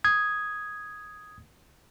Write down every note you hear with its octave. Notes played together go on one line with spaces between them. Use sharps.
D#6 G#6